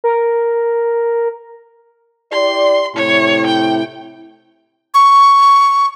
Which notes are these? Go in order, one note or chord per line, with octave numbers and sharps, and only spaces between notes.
A#4
E4 G4 D5 C6
A2 C3 E4 C#5
G5
C#6